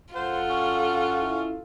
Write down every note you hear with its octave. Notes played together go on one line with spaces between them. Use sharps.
F#2 F4 A4 C5 F5 F#5
C#4
E4